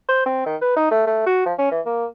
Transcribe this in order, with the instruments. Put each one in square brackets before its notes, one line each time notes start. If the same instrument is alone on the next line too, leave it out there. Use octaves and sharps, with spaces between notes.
[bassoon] C5
C4
D#3
B4
D#4
A3
A3
F#4
F3
C#4
E3
A#3